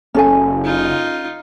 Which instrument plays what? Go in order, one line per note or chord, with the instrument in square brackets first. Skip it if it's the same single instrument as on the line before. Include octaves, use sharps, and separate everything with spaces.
[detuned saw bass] F#1 [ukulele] C#4 A4 G#5
[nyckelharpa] D#4 F4